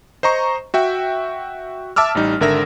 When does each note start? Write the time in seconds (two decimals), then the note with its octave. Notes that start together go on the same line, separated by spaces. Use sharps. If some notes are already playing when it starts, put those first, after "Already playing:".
0.23 C5 D#5 A#5 C#6
0.74 F#4 E5 G5
1.96 E5 A5 D6 E6 F6
2.15 A1 G3 D#4
2.40 G#1 D3 A#4 E5 A#6